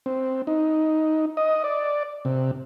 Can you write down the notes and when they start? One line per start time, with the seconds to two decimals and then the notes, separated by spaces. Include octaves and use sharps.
0.06 C4
0.47 D#4
1.37 D#5
1.64 D5
2.25 C3